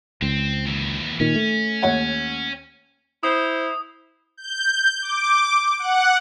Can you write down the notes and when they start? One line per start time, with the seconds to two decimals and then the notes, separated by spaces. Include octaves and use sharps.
0.22 C#2 C4
0.67 D#2 E3
1.20 A#2 D#3 C#4
1.35 A3
1.82 D#2 C#5 F#5
3.23 E4 C5 D#6
4.37 G6
5.02 D6
5.79 F#5